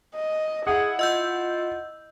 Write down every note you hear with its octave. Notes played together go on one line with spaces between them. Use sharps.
D#5
E4 G#4 F#5
F4 D#5 E6 G6